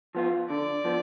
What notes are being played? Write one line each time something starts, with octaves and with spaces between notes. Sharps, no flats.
F3 B3 F4
D3 D5
F3 B3